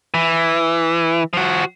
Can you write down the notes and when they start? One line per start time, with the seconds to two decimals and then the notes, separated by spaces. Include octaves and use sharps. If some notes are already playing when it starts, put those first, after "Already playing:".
0.14 E3
1.33 F3 F#4